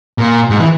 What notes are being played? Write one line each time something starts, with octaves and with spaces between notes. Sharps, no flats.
A#2
G#2
E3